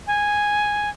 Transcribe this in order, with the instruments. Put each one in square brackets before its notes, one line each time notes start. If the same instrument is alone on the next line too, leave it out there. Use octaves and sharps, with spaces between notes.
[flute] G#5